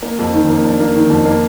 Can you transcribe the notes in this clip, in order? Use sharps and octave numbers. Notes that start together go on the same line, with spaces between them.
A#3
F2
D#3
A#3
D4
A#3
D#3
F2
A#3